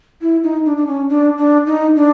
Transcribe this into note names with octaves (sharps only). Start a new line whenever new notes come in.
E4
D#4
D4
D4
C#4
D4
D4
D#4
D4